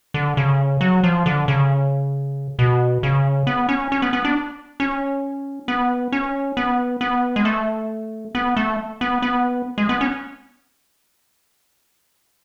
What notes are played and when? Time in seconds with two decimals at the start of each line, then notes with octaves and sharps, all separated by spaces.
0.14 D3
0.37 C#3
0.81 F#3
1.04 F3
1.26 D3
1.48 C#3
2.59 B2
3.03 C#3
3.47 B3
3.69 C#4
3.92 C#4
4.02 B3
4.13 B3
4.25 D4
4.80 C#4
5.68 B3
6.12 C#4
6.57 B3
7.01 B3
7.36 G#3
7.45 A3
8.35 B3
8.57 A3
9.01 B3
9.22 B3
9.78 G#3
9.89 B3
10.01 C#4